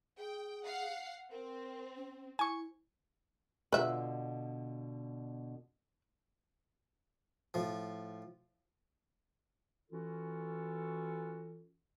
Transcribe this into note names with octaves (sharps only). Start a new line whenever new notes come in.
G#4 G5
F5 F#5 C7
C4 A#4
C#4
E4 G#5 C#6
B2 D3 F4 B4 E5
A2 F3
E3 C#4 F4 F#4 A4